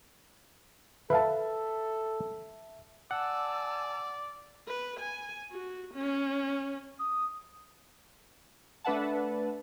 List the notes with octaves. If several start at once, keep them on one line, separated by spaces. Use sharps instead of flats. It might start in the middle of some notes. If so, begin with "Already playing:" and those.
A4 B4 E5 F5 A5
D5 F#5 G#5 A5 E6
B4
G#5
F#4
C#4
D#6
A3 D4 B4 E5 F#5 A5